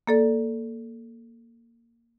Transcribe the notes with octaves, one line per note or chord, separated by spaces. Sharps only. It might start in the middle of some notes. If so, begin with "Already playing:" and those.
A#3 A4 D5